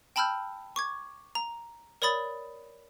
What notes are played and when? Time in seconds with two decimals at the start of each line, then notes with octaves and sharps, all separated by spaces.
0.16 G5 A5 B5 E6 F6 G6
0.76 C#6 D6 G#6
1.35 A#5
2.02 A#4 C#5 D5 B5 D#6 A6